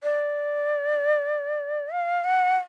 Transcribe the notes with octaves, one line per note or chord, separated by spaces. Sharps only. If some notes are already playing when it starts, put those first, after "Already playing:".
D5
F5
F#5